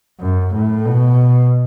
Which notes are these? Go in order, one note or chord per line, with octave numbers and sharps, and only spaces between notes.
F#2
A2
B2